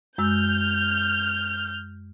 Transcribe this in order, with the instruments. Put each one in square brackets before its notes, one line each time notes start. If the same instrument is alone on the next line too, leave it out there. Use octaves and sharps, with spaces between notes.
[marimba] F#2 G#3 E6 [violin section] F6 G6